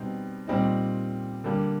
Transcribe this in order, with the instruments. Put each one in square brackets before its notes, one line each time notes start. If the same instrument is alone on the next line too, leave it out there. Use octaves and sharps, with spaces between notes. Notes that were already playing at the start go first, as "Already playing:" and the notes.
Already playing: [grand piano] B2 G3 C4 D#4
A#2 G3 C4 D#4
D3 G3 A#3